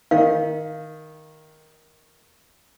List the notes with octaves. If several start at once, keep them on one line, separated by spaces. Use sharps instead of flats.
D#3 F5